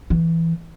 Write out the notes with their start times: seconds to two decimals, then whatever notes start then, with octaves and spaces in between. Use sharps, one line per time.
0.10 E3